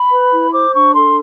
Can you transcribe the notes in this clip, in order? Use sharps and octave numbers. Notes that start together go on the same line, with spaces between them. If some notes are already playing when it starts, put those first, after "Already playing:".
Already playing: B5
B4
E4
C5 D6
D4 C#6
A4 C6